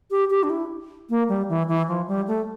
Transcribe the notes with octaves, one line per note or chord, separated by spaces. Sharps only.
G4
G4
D4
E4
A#3
G3
E3
E3
F3
G3
A3